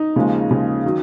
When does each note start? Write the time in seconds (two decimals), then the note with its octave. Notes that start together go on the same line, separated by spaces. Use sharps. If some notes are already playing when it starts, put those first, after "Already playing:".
Already playing: D#4
0.16 D#2 C#3 F3 G#3
0.50 D#2 C#3 F3 G#3
0.86 D#3 F#3